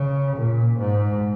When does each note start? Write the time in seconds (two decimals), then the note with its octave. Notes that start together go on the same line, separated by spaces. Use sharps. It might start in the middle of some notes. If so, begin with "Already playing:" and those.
Already playing: C#3
0.37 A#2
0.78 G#2